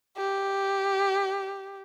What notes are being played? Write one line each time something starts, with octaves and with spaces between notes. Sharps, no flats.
G4